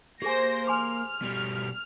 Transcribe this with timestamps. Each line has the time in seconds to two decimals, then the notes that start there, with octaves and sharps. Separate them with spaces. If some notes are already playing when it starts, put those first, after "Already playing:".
0.22 A#3 G4 G#4 C5 G#5 A#6
0.67 G#5 C6 D6 F6
1.22 B2 G3